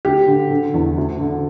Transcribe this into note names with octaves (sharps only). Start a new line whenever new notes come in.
D2 G4
D3
D3
E2
D2
D3